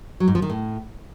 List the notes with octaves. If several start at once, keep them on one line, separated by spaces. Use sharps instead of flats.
F#3
G#2
F3
D#3
A2